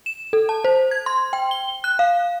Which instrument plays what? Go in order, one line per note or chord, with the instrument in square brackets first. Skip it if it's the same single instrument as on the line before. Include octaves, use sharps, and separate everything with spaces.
[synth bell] E7
A4
A5
C5
G#6
C6
G5
G7
F#6
F5